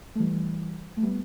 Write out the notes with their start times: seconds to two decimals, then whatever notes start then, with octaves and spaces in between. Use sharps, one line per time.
0.15 A3
0.19 E3 G3
0.97 A3
1.02 G3 B3